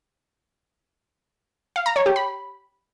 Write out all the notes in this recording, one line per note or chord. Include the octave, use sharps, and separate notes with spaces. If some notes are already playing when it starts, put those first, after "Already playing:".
F5
A#5
C#5
G4
B5